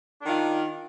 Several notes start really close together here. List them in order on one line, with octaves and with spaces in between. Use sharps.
D4 D#3 F4